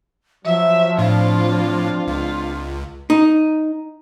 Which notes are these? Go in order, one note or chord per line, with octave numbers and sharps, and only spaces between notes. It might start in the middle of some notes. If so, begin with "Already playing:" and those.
F3 F#3 E5
A2 C4 D4 F4
C#2 F4
D#4